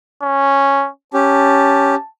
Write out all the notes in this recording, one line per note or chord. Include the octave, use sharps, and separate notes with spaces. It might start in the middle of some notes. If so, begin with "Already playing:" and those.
C#4
C#4 G4 A5